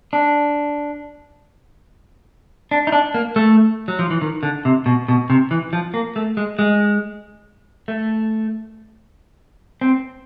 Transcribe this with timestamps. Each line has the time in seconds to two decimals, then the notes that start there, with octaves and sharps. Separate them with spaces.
0.13 D4
2.71 D4
2.87 D#4
2.92 D4
3.14 A#3
3.36 A3
3.88 F#3
3.99 F3
4.10 E3
4.22 D#3
4.43 D3
4.65 C3
4.86 B2
5.08 B2
5.30 C3
5.51 E3
5.73 F3
5.94 A#3
6.16 A3
6.37 G#3
6.59 G#3
7.88 A3
9.81 C4